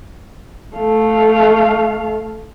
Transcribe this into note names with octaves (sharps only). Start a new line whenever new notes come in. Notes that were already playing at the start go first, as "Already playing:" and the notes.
A3 F5